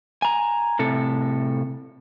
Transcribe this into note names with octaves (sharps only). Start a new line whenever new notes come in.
G#5 A#5
A2 C3 A4